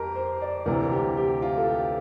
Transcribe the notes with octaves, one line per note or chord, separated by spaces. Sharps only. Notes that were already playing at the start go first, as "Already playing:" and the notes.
Already playing: F2 G4 A#4
C5
D5
D2 C3 E3 A#4
G4
G4
F4
A4
G4